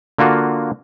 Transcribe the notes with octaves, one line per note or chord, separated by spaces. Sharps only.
D3 A#3 F4 F#4